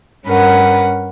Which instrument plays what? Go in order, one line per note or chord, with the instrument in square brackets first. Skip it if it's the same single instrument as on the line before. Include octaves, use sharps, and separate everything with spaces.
[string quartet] G2 C#4 A#4 B4 F#5